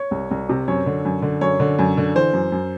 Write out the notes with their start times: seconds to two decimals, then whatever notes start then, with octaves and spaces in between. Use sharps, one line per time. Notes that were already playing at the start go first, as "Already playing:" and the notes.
Already playing: C#5
0.11 C2
0.31 C2
0.49 C3
0.68 F#2 C#5
0.86 D3
1.05 F#2
1.22 D3
1.41 F#2 C#5
1.60 D3
1.79 F#2
1.97 D3
2.15 E3 C5
2.33 F#2
2.52 F#2